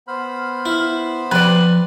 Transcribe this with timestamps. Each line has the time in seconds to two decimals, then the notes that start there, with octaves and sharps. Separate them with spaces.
0.08 B3 C5 B5 F6
0.66 E4
1.31 C3 F3 B4 D5